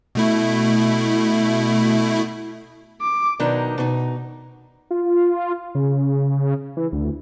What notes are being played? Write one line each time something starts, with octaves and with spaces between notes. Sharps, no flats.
B2 A3 E4
D6
B2 D#3 F#3 D4 D#4
B2 D#4
F4
C#3
E3
D2